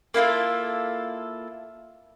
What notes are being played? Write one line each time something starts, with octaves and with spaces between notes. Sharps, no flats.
A#3 E4 F4 A4